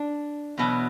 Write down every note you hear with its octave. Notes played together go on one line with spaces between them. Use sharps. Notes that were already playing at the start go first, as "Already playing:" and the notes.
Already playing: D4
E2 B2 F#3